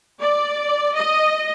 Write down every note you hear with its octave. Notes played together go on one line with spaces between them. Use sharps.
D5
D#5